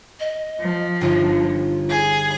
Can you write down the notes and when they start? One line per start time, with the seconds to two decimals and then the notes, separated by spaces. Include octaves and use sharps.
0.20 D#5
0.58 F3
1.01 G1 D#4 F4
1.88 G#4